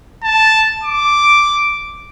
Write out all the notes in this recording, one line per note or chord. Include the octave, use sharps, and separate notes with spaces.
A5
D6